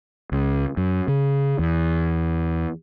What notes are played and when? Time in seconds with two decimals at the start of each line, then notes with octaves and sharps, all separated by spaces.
0.32 C#2
0.77 F#2
1.08 C#3
1.59 E2